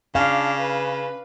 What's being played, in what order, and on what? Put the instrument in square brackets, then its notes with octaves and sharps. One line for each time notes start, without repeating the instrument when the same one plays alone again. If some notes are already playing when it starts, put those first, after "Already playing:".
[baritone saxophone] C#3 [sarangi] D4 [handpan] F5
[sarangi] B4